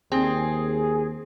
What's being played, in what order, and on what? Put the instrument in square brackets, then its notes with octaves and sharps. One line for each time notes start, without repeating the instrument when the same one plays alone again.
[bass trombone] D#2 [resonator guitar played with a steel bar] C4 [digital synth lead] G#4